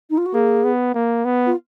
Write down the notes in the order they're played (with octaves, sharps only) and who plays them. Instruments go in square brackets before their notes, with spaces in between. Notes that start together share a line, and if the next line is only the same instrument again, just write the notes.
[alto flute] D#4
F4
F#4
[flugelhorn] A#3 [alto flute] G#4
[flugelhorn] B3
A#3
B3
[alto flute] F4